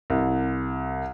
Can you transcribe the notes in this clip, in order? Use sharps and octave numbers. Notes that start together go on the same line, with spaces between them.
C2